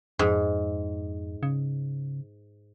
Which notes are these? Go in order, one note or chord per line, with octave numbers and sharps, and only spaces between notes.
F2 G#2
C#3